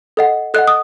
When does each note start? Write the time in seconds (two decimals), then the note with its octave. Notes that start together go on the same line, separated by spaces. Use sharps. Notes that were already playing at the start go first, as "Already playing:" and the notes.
0.17 A4 D#5 F#5
0.54 A4 D#5 F#5 F#6
0.68 D#6